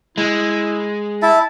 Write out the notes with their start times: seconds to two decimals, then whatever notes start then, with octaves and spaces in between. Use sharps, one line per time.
0.18 G#3 E4
1.22 E4 E5 A5